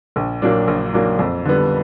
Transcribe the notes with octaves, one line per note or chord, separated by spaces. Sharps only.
A#1
A#2 F#3 A#3 D4
A#1
A#2 F#3 A#3 D4
F2
D3 G3 B3